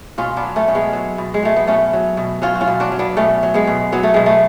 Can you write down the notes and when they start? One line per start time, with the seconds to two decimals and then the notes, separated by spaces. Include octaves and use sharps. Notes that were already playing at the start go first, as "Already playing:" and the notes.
0.18 B2 C#4 F4
0.37 B3 D4
0.43 F#3
0.56 A3 C#4
0.68 B2 C#4
0.75 G#3 B3
0.93 F#3
1.18 B2
1.34 G#3
1.43 F#3 A3
1.56 B3
1.67 B2 A3 C#4
1.93 F#3
2.17 B2
2.42 F#3 C#4 F4
2.55 F#4
2.61 C#4 F4
2.68 B2
2.80 D4 F#4
2.92 F#3
2.99 B3 D4
3.17 B2 A3 C#4
3.43 F#3
3.54 G#3 B3
3.67 B2
3.92 F#3 B3
4.03 A3
4.14 B2 G#3
4.26 A3